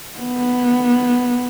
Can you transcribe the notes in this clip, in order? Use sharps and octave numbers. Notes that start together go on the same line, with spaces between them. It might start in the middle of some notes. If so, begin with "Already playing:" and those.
B3